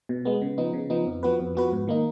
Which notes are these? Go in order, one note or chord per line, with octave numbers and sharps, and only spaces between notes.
B2
G#3 B3
C#3
F3 B3 D#4
C#3
F3 B3 D#4
F2
F3 B3 F#4 B4
F2
F3 B3 F#4 B4
G#2
D#3 A#3 D#4